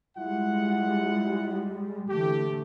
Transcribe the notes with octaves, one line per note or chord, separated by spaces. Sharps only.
G3 G#3 E4 F4 F#5
D3 E3 A3 G4